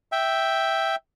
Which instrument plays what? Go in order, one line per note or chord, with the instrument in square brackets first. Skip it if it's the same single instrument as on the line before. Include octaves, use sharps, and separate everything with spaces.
[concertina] E5 G5